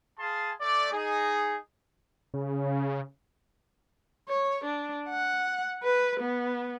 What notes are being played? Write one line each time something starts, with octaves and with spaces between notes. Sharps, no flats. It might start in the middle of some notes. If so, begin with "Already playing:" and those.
G#4 F5 G#5 A5 C6
A3 D5
D#4 G#4
C#3
C#5
D4
F#5
B4
B3